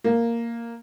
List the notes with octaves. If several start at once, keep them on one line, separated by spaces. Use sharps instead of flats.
A#3